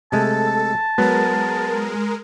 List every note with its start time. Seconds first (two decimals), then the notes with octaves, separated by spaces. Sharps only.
0.12 C3 G#3 A3 A4 A5
0.98 F#3 G#3 B3 A#4